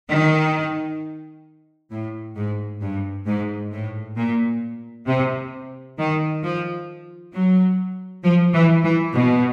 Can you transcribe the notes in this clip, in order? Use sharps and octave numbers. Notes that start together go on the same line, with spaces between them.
D#3
A2
G#2
G2
G#2
A2
A#2
C3
D#3
F3
F#3
F3
E3
E3
B2